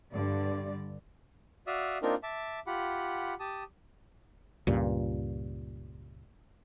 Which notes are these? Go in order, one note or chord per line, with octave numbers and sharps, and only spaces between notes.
G2 D3 G3 D5
F#4 D5 E5 F5 D#6 E6
A#3 C4 D4 D#4 F4 A#4
E5 A5 D6
F4 G4 F#5 B5
G4 A5 D#6
C#2 G2 A#2